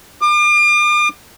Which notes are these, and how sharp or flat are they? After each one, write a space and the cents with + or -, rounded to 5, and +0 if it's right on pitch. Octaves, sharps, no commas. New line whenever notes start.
D6 +40